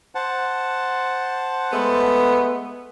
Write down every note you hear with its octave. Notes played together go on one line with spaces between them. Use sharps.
C5 F#5 A5
G#3 A3 B3